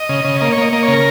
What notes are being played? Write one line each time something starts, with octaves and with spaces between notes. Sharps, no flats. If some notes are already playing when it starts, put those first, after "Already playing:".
Already playing: D#5
C#3
C#3
A#3 D#5
C#5
A#3 D#5
A#3 D#5
C#5
C#3
A#4